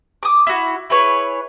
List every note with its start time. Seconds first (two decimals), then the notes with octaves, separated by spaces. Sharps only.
0.23 D6 D#6
0.47 E4 F#4
0.90 E4 G#4 B4 C#5